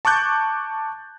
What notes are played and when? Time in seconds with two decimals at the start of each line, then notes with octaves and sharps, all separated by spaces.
0.05 A5 C#6 D6 F#6 G6 A6